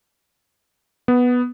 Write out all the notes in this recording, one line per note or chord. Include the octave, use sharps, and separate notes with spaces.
B3